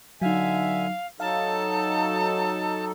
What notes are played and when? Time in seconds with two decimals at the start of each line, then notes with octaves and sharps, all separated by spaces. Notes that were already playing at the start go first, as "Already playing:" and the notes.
0.22 D3 F#3 D#4 E5 F5 G#5
1.20 F#3 D#4 A4 F5 A5